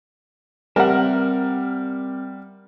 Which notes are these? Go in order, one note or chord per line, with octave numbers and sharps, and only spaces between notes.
G3 C4 A#4 E5 F#5